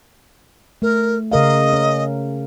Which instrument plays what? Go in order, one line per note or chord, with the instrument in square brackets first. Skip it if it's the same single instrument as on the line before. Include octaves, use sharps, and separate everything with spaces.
[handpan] A3 [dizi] A#4
[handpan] C#3 A#4 F5 [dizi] D#5
[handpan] C#4